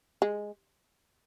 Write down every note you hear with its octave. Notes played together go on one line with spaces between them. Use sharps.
G#3